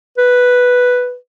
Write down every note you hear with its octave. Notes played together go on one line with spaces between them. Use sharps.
B4